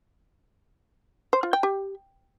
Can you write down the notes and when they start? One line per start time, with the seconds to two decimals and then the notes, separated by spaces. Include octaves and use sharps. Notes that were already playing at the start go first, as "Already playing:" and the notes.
1.33 C5
1.43 F4
1.53 G5
1.63 G4